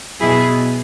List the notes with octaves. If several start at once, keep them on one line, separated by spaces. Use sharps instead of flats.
B2 F#3 E4 G#4